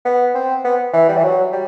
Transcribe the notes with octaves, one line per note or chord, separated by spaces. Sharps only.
B3
C4
B3
E3
G3
E3
F#3
G3